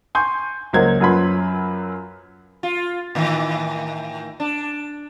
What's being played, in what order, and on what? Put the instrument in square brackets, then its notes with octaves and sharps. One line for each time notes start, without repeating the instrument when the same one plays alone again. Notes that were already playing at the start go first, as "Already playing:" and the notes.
[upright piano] G#5 C6 C#6 G6
C#2 F#3 A#3 C5 G#6
F#2 F#3 F4 B4 B5 C6
[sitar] F4
A2 D#3 E3
D4